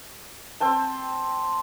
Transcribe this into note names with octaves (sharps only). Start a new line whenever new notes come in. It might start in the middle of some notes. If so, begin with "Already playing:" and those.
C4 C5 G5 A5